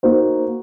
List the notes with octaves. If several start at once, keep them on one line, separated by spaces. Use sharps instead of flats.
A#3 D#4 F#4 C5